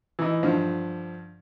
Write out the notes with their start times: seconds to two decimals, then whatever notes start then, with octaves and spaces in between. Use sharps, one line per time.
0.19 E3 D#4
0.43 G2 D3 F3